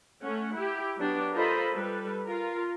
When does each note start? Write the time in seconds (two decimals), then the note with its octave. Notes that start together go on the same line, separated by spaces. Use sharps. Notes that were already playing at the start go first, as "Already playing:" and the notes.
0.22 A3 C#4 F#5
0.56 E4 G4
0.98 F#3 B3 D4 G4
1.34 F4 A4 A#4 C5 D#5 B5
1.73 G3 A4 B4
2.26 F4 A#4